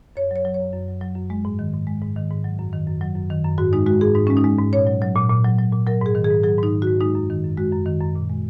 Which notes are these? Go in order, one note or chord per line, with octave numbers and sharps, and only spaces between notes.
F#2 C#5
F#3 C#5
F#3
C#5
F#2
F#2
F#3
F#3
F#2
G#3
G#2
D#3
G#2
G#3
G#2
D#3
G#2
F#3
F#2
D#3
F#2
F#3
F#2
D#3
F#2
G#2 F#4
G#3 D#4
G#3 F#4
G#2 G#4
G#2 D#4
G#3 C#4
D#4
G#3
G#2
A#2 C#5
F#3
F#3
A#2
A#2
F#3
F#3
A#2
F#3 A#4
G#2 G#4
D#3
G#4
G#2
F#3 G#4
G#2 D#4
D#3
G#2 F#4
G#3 D#4
F#2
D#3
F#2
G#3 F#4
F#2
D#3
F#2
A#2
G#3